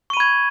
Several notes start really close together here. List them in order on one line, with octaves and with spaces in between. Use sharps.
C#6 D#7 B5 G#6